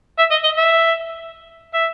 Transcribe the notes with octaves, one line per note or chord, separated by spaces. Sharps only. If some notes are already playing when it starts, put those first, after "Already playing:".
E5
D#5
D#5
E5
E5